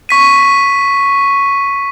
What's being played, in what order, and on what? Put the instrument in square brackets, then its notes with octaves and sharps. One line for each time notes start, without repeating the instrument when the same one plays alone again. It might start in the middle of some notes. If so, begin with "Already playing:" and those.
[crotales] C#6 B6 D#7